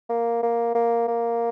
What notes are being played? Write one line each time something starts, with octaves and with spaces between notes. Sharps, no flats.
A#3
A#3
A#3
A#3